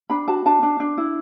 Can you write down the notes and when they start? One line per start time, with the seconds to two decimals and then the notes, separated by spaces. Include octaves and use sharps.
0.10 D4 B5
0.28 F#4 A5
0.46 D4 A5
0.63 D4
0.80 D4
0.98 E4